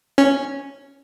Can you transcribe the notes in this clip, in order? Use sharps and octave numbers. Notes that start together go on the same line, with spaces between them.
C#4